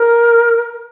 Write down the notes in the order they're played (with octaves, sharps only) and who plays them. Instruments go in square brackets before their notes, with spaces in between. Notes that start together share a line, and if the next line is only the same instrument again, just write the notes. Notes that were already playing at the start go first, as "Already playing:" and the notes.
Already playing: [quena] A#4